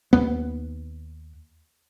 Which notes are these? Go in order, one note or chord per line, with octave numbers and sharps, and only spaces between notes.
D#2 B3